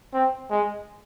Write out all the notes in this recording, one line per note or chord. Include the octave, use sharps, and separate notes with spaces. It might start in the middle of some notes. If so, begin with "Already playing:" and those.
C4
G#3